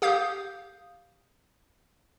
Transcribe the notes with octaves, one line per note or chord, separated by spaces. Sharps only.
G4 F5 D#6 G6